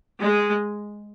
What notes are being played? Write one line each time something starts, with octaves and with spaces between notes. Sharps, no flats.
G#3